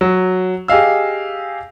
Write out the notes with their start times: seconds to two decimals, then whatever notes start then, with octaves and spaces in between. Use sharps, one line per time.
0.01 F#3
0.68 G4 G#4 D#5 F5 E6